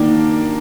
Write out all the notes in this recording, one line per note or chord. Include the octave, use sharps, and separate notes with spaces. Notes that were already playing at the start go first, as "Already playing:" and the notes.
Already playing: D#3 A#3 D4